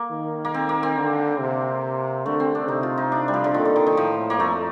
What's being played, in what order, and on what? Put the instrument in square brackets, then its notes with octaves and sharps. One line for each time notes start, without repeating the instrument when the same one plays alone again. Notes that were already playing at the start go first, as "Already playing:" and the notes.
Already playing: [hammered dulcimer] A#3
[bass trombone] D#3
[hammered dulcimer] A#3
C4
A#3
C4
[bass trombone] D3
C3
[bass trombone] D3 [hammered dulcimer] A3
[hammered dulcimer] C4
D4
[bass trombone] C3 [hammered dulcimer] D#4
[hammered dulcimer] F4
D#4
D4
G3
F3
D3
[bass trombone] A#2 [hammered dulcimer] D#3
[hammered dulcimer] D3
D#3
D#3
[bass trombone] A2 [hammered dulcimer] F3
[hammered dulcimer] A#3
[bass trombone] F2 [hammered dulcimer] A3